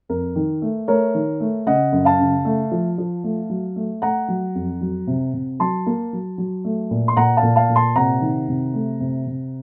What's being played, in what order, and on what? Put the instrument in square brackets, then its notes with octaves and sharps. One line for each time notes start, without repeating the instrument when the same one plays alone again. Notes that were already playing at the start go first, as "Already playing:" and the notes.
[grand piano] F2 A#4
D#3
A3
A3 A#4 C#5
D#3
A3
C#3 D#5 F#5
F#2
F5 A5
C#3
A3
F3
F3
A3
F#3
A3
A3 F#5 A#5
F#3
F2
F#3
C3
C3
F#3 A5 C6
A#3
F#3
F#3
A3
A#2
C6
A#2 F#5 A#5
F5 A5
A#2
F5 A5
A#2
A5 C6
C3 F#5 A#5
D#3
C3
A3
C3
C3